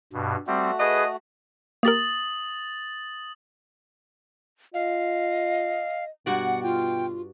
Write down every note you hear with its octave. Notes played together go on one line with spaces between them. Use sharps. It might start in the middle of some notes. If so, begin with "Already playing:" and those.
G2 B2
G3 A3 C4 F#4
G#4 B4 D#5
A#3 G4 A#4 D#6 A6 F#7
F4 D#5 F5
G2 B2 F#4 D5 F#5
F4 G5